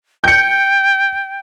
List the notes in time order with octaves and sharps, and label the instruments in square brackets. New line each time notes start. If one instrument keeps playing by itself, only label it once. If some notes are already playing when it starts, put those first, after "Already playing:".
[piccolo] G5 [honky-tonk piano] G6 C#7